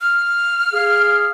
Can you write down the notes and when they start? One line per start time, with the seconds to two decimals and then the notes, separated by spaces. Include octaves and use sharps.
0.01 F6
0.73 G#4 F5